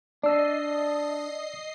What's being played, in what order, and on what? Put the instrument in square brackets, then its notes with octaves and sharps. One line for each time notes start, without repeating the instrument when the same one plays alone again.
[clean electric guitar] D4 [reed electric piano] D5 E6 [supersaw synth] D#5 C7